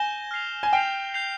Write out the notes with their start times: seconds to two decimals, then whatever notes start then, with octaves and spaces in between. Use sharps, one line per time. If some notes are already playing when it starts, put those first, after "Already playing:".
Already playing: G#5 G6 A#6 E7 G7
0.31 F6 C7 F7
0.63 G#5
0.73 G5 F6 C7 F7
1.14 G6 C7 F7